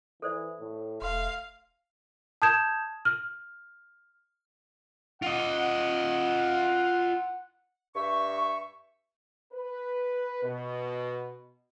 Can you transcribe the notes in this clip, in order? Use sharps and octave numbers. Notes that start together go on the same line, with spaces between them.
E3 A4 C5 D5
A2
E1 A3 F5 C6
A5 D#6 G6 G#6 E7
F6
F4 D#5 F#5
G2 E5 C#6
B4
B2